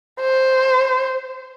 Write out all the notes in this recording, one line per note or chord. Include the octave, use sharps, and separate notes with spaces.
C5